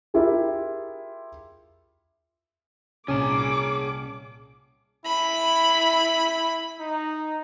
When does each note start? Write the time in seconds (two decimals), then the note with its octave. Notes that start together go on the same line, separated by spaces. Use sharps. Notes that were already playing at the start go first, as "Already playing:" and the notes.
0.14 E4 F4 G4 G#4 A#4
3.08 C2 A#2 C#4 G#4 A5 D6
5.06 E4 B5
6.80 D#4